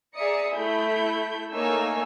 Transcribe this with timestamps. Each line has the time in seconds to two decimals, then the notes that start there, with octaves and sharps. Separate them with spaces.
0.15 G#4 D5 E5 A#5 D#6 C#7
0.54 A3 E4 B5 G6
1.54 A3 A#3 D#4 C#5 G#5 E6